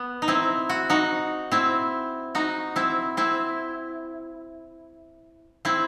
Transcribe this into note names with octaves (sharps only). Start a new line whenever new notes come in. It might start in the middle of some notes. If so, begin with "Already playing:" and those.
Already playing: B3
D#4
C4 E4
F#4
D#4 F#4
C4 E4
D#4 F#4
C4 E4
C4 E4
C4 E4